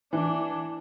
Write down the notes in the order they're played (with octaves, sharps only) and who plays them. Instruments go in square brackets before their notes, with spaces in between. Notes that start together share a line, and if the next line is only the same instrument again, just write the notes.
[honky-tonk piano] E3 [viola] D4